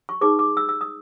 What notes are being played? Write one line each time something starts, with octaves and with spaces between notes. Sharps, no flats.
C#6
D#4 G#4 B4 D6
D6
E6
E6
D#6